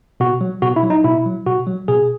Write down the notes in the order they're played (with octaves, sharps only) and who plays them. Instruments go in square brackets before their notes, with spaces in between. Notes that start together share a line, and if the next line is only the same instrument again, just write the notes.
[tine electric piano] B2 F#4
F#3
B2 F#4
E4
F#3
D#4
B2 E4
F#3
B2 F#4
F#3
B2 G#4